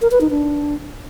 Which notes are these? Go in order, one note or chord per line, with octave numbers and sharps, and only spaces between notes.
A#4
B4
D#4
D4